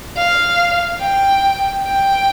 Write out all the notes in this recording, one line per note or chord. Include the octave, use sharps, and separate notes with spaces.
F5
G5
G5